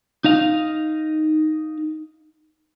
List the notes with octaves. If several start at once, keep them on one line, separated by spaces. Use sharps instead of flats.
D#4 D#5 F5